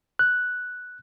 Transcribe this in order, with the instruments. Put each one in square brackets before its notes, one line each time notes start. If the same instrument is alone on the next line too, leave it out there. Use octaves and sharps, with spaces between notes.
[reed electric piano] F#6